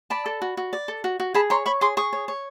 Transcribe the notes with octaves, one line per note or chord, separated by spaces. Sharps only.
D5 A5 B5
A4
F#4
F#4
D5
A4
F#4
F#4
G#4 A5 B5
C#5 A#5 C6
C#5 B5 C#6
G#4 C6 D6
G#4 C#6 D#6
C#5
C#5